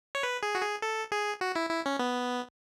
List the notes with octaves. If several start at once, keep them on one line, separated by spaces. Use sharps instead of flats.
C#5
B4
G#4
F#4
G#4
A4
G#4
F#4
E4
E4
C#4
B3